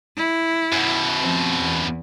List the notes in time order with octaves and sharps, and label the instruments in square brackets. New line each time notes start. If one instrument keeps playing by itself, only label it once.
[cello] E4
[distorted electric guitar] F#2 B2
[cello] F3 C4
E2